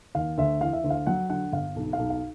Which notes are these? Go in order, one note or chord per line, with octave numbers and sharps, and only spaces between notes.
D#2 F5
D2 E5
E3 F5
E5
D2
F5
F#3 F#5
D3 F#5
G1 F5
B1
F5
B1
F5